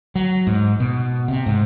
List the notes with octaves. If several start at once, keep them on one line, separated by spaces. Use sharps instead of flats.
F#3
G#2
B2
C3
G#2